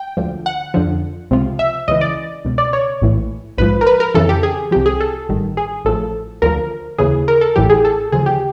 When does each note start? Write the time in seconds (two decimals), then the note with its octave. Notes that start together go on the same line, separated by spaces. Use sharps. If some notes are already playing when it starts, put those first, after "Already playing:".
Already playing: G5
0.17 D2 D3 F3
0.46 F#5
0.74 F2 D3 F3
1.31 C#2 C3 F3
1.59 E5
1.88 C#2 C#3 E3 D#5
2.01 D5
2.45 C#2 B2
2.58 D5
2.73 C#5
3.02 A#1 A2 E3
3.58 A#1 G#2 F3 B4
3.81 A#4
3.87 B4
4.00 A#4
4.15 F2 C#3 E3 A4
4.29 G4
4.43 G#4
4.71 C2 C3 F3 G4
4.86 G#4
5.00 A4
5.29 A1 G2 D#3
5.57 G#4
5.85 A1 A2 F3 A4
6.42 D2 D3 F3 A#4
6.98 D#2 C#3 E3 G#4
7.28 A#4
7.41 A4
7.56 A1 A2 E3 G4
7.70 G#4
7.85 A4
8.12 D2 C#3 F3 G#4
8.26 G4